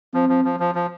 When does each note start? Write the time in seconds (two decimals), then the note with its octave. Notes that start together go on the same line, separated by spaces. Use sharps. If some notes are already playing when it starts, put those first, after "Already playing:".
0.14 F3 C4
0.29 F3
0.45 F3
0.60 F3
0.75 F3